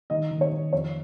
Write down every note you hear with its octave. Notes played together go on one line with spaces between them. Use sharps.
D#3 D#5
D#3
C#5
D#3
F2 C#5